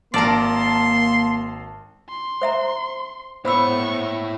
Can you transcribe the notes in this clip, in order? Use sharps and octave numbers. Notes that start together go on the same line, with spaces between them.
G#1 A#3 A#4 D5 A5 C6
C6
C5 E5 A#5
B3 E4 C5 C#5 B5 C#6 E6